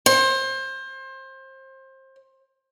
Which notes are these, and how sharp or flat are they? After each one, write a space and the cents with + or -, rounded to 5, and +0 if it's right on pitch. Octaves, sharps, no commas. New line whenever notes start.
C5 +25